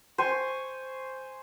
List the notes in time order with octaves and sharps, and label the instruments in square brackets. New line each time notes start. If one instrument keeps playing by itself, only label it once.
[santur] C5 G#5 C#6